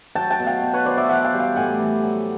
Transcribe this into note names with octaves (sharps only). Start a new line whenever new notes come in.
F#3 G5 A5
G5 A5
B2
F5 G5
B2
B4 C#5
F#3 C5 D5
D5 E5
E3 E5 F#5
F5 G5
G3
F5 G5
A2 F#5 G#5
E3
F#3